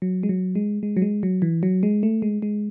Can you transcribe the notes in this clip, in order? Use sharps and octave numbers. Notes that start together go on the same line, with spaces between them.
F#3
G#3
F#3
G#3
G#3
F#3
G#3
F#3
E3
F#3
G#3
A3
G#3
G#3